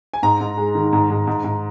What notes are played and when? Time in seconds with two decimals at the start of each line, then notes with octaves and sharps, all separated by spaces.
0.14 G#5
0.23 G#2 A#5
0.41 G#2
0.57 G#3
0.75 D#3
0.93 G#2
1.10 G#2
1.27 G#2
1.44 G#2